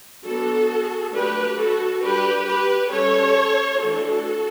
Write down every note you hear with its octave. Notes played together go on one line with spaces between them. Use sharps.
F#3 B3 D4 F#4 A4
F#3 A3 D4 G4 B4
F#4 A4
G3 D4 G4 B4
G4 B4
G3 C#4 A4 C#5
E3 A3 D4 F#4 A4